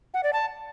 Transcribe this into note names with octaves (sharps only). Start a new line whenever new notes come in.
F#5
D5
A5